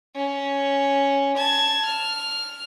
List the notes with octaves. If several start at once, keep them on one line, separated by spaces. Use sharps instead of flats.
C#4
A5 G#6
F6